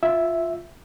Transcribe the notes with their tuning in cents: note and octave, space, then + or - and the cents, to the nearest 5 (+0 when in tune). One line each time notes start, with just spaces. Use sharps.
F4 +0 E5 +0